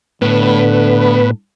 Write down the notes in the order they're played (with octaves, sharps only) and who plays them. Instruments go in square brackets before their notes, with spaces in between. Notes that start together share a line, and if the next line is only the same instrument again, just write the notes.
[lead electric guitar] A2 [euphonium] D3 [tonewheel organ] B3 B4